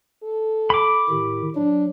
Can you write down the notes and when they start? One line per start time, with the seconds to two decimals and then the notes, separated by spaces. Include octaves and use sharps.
0.23 A4
0.70 B5 D6
1.09 A2 D#3 G4
1.56 F#3 D4